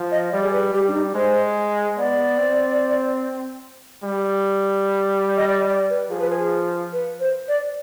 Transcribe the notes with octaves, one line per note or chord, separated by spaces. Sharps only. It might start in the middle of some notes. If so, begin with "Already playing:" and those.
Already playing: F3
D#5
G3 D5
G#4
B4
G3 G4
D4
D#4
G#3 C5
B3 D5
C4
G3
D#5
D5
D5
B4
F3 G#4
B4
G#4
B4
C5
D5